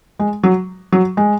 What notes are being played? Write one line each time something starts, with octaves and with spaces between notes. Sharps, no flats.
G#3
F#3
F#3
G#3